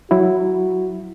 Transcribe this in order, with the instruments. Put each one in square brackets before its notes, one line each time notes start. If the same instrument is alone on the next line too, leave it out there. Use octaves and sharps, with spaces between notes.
[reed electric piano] F#3 E4 [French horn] F#4